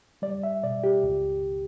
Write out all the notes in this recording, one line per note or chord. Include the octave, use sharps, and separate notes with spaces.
G3 D5
E5
B2 D5
G4
C#2